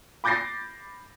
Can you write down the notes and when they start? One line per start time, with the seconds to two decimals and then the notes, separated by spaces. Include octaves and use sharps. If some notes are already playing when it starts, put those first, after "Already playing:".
0.24 B5 D6 G6 A6 A#6 C7